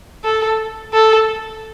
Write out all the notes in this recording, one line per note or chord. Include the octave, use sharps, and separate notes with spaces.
A4
A4